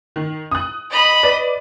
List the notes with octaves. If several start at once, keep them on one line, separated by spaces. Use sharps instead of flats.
D#3
D#6 F#6
D#5 B5
B4 D5